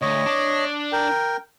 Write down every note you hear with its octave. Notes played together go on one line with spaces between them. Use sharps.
D2 C#5 D#5
D4
A#4 G5